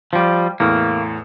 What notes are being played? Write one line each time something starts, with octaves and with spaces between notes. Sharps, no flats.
F3 G3
E2 A2 A#3